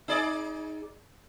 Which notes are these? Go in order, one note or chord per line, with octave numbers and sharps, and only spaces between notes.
D#4 G#4 D5